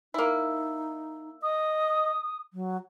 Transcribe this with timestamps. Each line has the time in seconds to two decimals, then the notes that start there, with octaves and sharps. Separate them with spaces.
0.14 A#3 D#4 E4
1.43 D#5 D#6
2.53 F#3